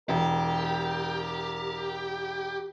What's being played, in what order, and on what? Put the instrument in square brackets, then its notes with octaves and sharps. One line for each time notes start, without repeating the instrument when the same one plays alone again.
[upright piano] E1 [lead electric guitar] G4 [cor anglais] A#4